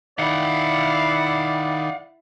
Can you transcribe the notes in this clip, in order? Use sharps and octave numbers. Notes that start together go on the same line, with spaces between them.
D#3 E4 D5 F5 F#5